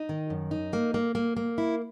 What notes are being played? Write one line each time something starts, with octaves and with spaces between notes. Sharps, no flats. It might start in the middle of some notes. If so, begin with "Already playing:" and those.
Already playing: D#4
D#3
F#2
D#4
A#3
A#3
A#3
A#3
E4